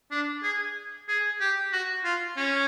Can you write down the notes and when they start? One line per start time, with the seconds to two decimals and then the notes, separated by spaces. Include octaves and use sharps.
0.11 D4
0.43 G#4
1.08 G#4
1.40 G4
1.73 F#4
2.04 F4
2.37 C#4